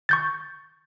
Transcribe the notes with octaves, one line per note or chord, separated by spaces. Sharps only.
C#6 G6 A6